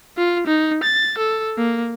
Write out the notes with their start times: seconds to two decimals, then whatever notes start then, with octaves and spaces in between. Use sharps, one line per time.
0.17 F4
0.47 D#4
0.83 A6
1.18 A4
1.58 A#3